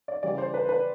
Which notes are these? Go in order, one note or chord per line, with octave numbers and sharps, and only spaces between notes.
D5
C#3 E3 G3 D5
C5
B4
B4